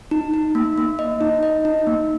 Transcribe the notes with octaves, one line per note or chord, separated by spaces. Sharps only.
D#4
D#4
A#3
A#3
D#5
D#4
D#5
D#4
A#3